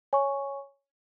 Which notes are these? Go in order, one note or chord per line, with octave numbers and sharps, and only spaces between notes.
C#5 G#5 C#6